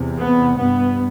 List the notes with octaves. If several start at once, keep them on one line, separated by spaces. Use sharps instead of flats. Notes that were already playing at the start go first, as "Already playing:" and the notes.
Already playing: E2 C3
B3
G2 B3